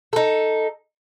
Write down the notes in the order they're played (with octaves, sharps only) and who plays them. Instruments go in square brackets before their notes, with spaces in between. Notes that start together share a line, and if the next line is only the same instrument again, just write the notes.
[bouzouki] D#4 A4